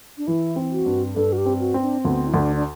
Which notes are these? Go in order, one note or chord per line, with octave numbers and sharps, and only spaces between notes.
D4
E3 E4
C4
F#4
G2
G2 A4
F#4
G4
C4
F#4
C4
D4
D2 B3
E4
D2 D4
D4